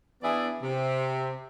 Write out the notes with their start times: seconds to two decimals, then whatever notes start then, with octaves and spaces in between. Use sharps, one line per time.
0.23 E3 B3 D4 E4 G#4 D5
0.62 C3